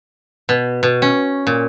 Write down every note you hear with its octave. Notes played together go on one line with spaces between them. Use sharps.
B2
B2
C#4
A#2